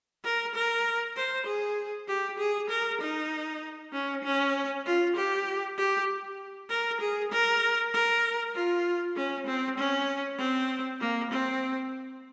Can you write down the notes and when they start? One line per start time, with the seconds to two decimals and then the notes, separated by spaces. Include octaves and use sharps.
0.24 A#4
0.55 A#4
1.16 C5
1.46 G#4
2.08 G4
2.39 G#4
2.70 A#4
3.01 D#4
3.93 C#4
4.24 C#4
4.86 F4
5.16 G4
5.78 G4
6.70 A#4
7.00 G#4
7.32 A#4
7.93 A#4
8.55 F4
9.16 C#4
9.47 C4
9.77 C#4
10.39 C4
11.00 A#3
11.31 C4